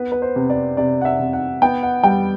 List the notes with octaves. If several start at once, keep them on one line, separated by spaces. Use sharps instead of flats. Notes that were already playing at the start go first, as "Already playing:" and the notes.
Already playing: B3 B4
B4
C5
C3
D5
C3 D5
F#5
E5
C3
F#5
B3 G5
F#5
G3 G5